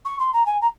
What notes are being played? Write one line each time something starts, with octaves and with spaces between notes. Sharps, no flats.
C#6
C6
A#5
G#5
A#5